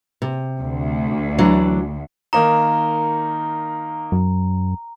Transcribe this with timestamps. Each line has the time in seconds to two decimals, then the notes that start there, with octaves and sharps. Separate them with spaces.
0.22 C3
0.59 D2
1.38 E3 F#3 D4
2.33 D#3 A#3 D#4 A#5
4.12 F#2